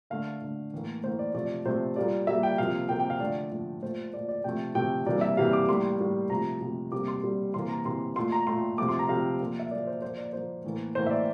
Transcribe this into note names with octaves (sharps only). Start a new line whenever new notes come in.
D3 A3 F5
D3 A3
A2 E3 A#3
A2 E3 A#3 C5
D5
C3 F3 A3 D5
C3 F3 A3 C5
A#2 G3 A#3 D5
A#2 G3 A#3 E5
G5
C3 F3 A#3 F5
C3 F3 A#3 G5
G5
F5
D3 F3 A3 D5
D3 F3 A3
A#2 A3 C5
A#2 A3 D5
D5
C3 F3 A3 G5
C3 F3 A3 G5
C3 E3 G3 A#3 D5
E5
C3 E3 G3 A#3 F5
D6
A2 G3 A#3 C6
A2 G3 A#3
C3 F3 A3 A#5
C3 F3 A3
C3 G3 A#3 D6
C6
C3 G3 A#3
C3 E3 A#3 C6
A#5
C3 E3 A#3 C6
A#2 A3 C6
A#5
A#2 A3 C6
C3 F3 A3 D6
C6
A#5
C3 F3 A3 F5
A#2 F3 A#3
E5
A#2 F3 A#3 D5
C5
A#2 F3 A#3 C5
D5
A#2 F3 A#3 C5
A2 E3 A#3
A2 E3 A#3 C5
E5
D5